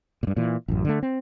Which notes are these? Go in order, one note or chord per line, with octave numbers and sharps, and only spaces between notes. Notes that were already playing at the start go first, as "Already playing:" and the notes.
G2 A#2
A#2 E3
A1 F#2
D3 G#3 A3
C4